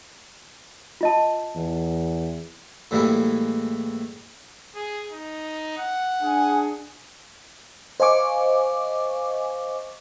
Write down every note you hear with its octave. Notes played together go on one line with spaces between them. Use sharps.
F4 D#5 A5
E2
A2 E3 G3 G#3 A#3 E4
G#4
D#4
F#5
D4 G#4 G#5
C5 D#5 F5 G#5 C#6 D6